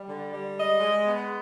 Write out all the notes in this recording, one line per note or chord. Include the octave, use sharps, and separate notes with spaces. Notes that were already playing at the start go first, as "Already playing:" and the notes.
Already playing: G3
D3
G3
G#3 D#5
G#3
B3